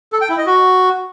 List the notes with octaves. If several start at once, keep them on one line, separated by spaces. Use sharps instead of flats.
A4
G5
E4
D#5
F#4